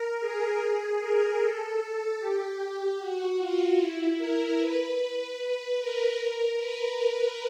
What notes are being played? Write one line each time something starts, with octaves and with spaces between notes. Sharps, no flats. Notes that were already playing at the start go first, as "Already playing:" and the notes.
Already playing: A#4
G#4
A#4
A4
A4
G4
F#4
F4
E4
A#4
B4
A#4
A#4
B4